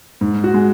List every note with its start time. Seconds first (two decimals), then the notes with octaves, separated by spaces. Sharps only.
0.21 G#2
0.44 F#4
0.54 G#3